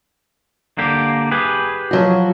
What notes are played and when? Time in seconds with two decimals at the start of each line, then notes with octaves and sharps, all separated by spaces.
0.78 D3 A#3 G4
1.31 G4 G#4 B4
1.91 F3 F#3 F#4